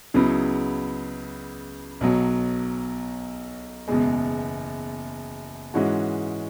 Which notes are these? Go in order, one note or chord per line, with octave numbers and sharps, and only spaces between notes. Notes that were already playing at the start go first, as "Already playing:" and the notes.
C#2 C#3 F#3 B3 E4
B1 B2 F#3
F#1 E2 B2 G#3
G#2 E3 G#3 C#4 F#4